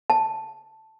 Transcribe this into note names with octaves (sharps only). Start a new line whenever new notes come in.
A5